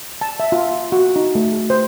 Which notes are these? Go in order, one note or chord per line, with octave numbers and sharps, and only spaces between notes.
A5
E5
F4
F#4
D#4
A3
G#4
C5